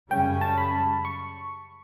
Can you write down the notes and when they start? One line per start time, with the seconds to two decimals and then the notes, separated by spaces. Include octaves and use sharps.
0.11 F#2 C#3 G3 C#4 G5
0.41 A5
0.58 B5
1.05 C#6